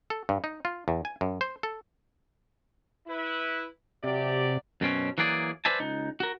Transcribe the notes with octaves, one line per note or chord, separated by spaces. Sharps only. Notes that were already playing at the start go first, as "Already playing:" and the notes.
A4
G2
D#4
F4
E2
G#5
F#2
C5
A4
E4 B4
C3 F#3 G4 D5
F#2 B2 C4 C#4
E3 F#3 A#3 G#4 D5
B4 C5 D5 E5 G#5 A5
C#2 D#4
F#4 A#4